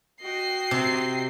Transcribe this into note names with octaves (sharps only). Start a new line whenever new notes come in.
F#4 D#5 G5 C7
C3